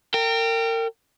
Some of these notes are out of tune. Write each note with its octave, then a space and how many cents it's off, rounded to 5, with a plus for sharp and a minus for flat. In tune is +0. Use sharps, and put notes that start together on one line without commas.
A#4 -35 G5 +0